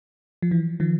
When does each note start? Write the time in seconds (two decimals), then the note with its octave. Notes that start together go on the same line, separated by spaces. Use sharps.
0.42 F3
0.51 E3
0.80 D#3 F3